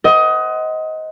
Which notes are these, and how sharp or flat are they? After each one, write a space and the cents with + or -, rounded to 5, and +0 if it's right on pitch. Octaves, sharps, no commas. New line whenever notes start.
C5 -15 D#5 +20 F#5 +15